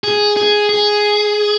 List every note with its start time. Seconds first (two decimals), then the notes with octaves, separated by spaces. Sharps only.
0.04 G#4
0.37 G#4
0.69 G#4